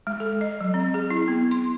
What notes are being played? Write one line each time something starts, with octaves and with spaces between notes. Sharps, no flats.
G#3
A4
D#5
F#3
C4
G#4
E4
B3
C6